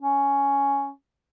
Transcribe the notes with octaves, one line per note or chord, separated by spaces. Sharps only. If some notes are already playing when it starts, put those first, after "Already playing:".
C#4